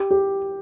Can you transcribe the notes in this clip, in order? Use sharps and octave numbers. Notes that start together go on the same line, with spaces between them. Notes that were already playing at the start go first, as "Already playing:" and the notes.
Already playing: G4
G4